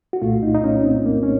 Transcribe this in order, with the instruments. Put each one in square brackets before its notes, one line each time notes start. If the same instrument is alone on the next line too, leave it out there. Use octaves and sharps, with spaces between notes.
[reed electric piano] F#4
C2 A#2 A3 F4
D#4
D#4
C#4
C4
A#3
C#4